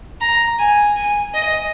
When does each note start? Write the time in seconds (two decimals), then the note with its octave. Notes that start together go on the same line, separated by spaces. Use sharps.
0.21 A#5
0.59 G#5
0.97 G#5
1.34 D#5